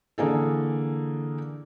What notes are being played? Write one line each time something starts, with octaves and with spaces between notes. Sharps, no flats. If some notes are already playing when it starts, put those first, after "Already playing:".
D3 E3 A#3 G#4 A4